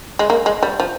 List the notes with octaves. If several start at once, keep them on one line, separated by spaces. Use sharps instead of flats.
G#3
A#3
G#3
G3
F3